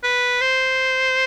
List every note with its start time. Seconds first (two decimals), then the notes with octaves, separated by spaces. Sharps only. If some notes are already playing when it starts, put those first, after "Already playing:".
0.04 B4
0.41 C5